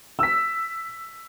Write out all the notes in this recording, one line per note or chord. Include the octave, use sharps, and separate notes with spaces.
E6 B6